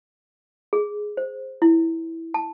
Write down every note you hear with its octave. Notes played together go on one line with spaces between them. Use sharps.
G#4
C5
E4
A5